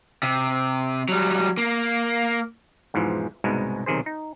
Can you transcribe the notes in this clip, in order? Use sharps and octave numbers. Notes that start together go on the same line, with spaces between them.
C3
F#3 G3
A#3
E2 G#2 B2 E3 F3
C2 G#2 B2 G#3
B1 C3 D#3 G#4 C5
D#4